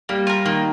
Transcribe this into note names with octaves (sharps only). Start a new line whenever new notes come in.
G3 A#3
F4 A#4
D#3 A#3